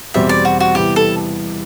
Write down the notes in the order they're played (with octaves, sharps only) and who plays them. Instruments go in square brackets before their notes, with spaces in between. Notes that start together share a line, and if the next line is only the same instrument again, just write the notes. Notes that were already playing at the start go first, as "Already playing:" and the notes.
[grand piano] E2 B2 G3 C4 [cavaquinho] E5
[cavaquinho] D5
F#4
F#4
[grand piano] C3 E3 G3 B3 E4 [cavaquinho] G4
[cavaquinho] A4